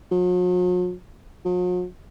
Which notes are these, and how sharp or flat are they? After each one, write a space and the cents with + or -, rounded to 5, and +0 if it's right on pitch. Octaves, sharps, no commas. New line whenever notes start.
F#3 -45
F#3 -45